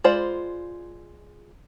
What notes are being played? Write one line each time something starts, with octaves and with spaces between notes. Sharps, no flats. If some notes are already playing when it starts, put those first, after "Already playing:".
G#3 F4 C5 D5 B5